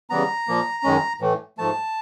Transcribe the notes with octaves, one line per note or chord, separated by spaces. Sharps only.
C#3 E3 G3 B3 A#5
A#2 F3 A#3
F#2 D#3 G#3 C#4
A2 E3 A3
G#2 F3 A3 A5